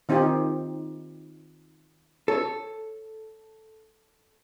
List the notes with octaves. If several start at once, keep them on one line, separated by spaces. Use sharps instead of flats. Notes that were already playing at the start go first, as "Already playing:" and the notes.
D#3 C4 D#4 F4 G4
A4 C#5